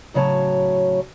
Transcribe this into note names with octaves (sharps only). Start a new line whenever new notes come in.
A2 C#3 F#3 C#5 A5